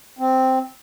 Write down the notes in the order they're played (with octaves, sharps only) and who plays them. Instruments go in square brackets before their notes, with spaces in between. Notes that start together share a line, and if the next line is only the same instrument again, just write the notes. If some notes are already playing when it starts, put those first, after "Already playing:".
[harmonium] C4